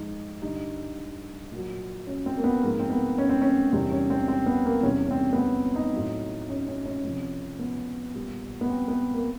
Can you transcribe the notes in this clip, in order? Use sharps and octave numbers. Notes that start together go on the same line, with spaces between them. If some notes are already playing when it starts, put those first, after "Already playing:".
Already playing: G#2 F3 G#3 D#4
G2 D3 G3 D#4
A#2 F#3
C#4
C4
A#3
B3
G#2 F3 G#3 A#3
C4
B3
C#4
C4
C#4
E2 C3 D#3 G3 C4
C#4
C4
C4
B3
A#3
E2 C3 D#3 G3 C#4
C#4
C4
B3
C4
D#4
A2 F#3
C#4
C#4
C#4
F2 C3 F3
B3
A#2 G3
B3
C4
B3
A#3